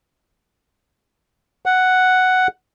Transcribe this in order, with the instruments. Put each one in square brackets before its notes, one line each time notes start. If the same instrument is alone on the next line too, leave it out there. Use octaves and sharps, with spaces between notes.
[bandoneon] F#5